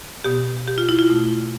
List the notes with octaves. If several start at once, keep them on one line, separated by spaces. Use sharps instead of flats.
B2 B3 G4
G4
F4
E4
F4
B2 A3